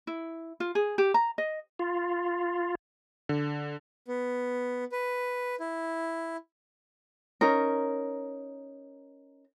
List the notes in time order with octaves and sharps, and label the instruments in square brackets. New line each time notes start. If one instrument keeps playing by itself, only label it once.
[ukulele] E4
F4
G#4
G4
A#5
D#5
[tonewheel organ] F4
[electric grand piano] D3
[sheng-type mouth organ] B3
B4
E4
[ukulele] C#4 D#4 A#4